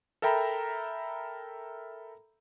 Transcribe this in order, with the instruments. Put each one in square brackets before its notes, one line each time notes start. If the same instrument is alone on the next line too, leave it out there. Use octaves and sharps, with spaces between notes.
[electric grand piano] A4 A#4 E5 G5 A#5 B5